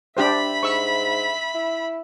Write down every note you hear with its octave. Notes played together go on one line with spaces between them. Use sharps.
D4 G4 C5 E5 B5
G#2 C#6 E6
E4